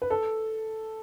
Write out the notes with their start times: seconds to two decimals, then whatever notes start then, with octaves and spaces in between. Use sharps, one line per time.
0.02 B4
0.10 A4